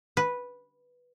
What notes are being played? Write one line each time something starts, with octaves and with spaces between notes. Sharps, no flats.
B4